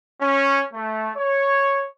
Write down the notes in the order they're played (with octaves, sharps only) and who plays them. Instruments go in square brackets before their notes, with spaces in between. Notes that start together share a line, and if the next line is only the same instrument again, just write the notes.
[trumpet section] C#4
A3
C#5